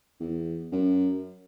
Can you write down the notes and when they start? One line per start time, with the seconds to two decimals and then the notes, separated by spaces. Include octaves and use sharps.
0.20 E2
0.72 F#2